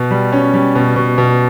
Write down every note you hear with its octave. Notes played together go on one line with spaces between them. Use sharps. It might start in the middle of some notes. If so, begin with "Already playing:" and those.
Already playing: B2
G3
C#4
G3
B2
B2
B2